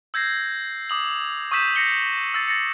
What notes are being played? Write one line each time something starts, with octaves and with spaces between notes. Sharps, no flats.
E6 G6 G#6 A#6 C7
D6 D#6 F#7
C#6 D#6 E6 G6 B6 E7
A#6 C7 C#7 G7
E6 A6 C#7
A6 A#6 C#7